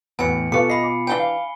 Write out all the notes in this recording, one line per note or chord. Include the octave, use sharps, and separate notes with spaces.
E2 A2 F#3 B3 G#5 C#7
B2 F4 G4 A4 B4 F5 C#6 C#7
D#5 B5 C7
D6
E3 D4 G4 G#5 G7
F5